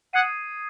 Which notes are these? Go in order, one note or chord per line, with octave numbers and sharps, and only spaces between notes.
F#5 D#6 G#6 C7 D#7